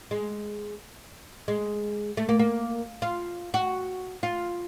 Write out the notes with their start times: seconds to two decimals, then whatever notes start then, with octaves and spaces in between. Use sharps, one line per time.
0.11 G#3
1.48 G#3
2.17 A3
2.29 A#3
2.39 A#3
3.02 F4
3.54 F#4
4.23 F4